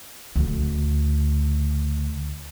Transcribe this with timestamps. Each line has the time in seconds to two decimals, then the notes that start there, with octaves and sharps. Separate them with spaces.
0.36 D2 C#3